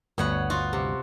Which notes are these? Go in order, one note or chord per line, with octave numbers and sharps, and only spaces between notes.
G1 D2 D3 B3 C#5 F#5
F4 F#4
C3